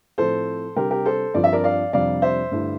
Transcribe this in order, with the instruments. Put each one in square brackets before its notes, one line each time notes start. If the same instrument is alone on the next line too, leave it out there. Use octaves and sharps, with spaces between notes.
[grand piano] A2 F3 A3 C4 A4 C5
C3 G3 D4 G4 A#4
G4 A#4
A4 C5
G2 F3 C4 D5
E5
A#4 D5
D5 F5
F2 C3 G3 D4 D5 F5
C5 E5
G2 D3 A3 E4